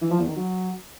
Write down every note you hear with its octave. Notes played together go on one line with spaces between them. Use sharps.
E3
F3
E2
D#3
F#3